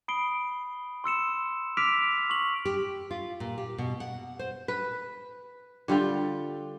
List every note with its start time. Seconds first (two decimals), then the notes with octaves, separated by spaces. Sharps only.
0.08 B5 D#6 C7 D7 G7
1.04 C6 E6 C#7 E7
1.77 D6 E6 F6 B6 D7 F7
2.30 C#6 F#7
2.65 G4
3.11 F4
3.40 A#2
3.58 G4
3.78 B2
4.00 F#5
4.39 C5
4.68 B4
5.88 D3 G3 F4 G5